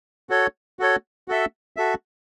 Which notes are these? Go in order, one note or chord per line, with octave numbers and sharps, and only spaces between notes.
F#4 A4 C#5
F#4 A4 C#5
F#4 A4 E5
F#4 A4 E5